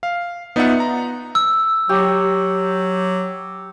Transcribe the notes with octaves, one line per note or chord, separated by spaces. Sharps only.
F5
B3 D#4 F4 D5 E5 F#5
A#5
E6
F#3 G4